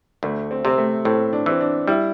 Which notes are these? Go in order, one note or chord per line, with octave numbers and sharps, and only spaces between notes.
D2 A3
C4
C3 C4
A3
A2 C4
D4
E3 C4
D4
G3 E4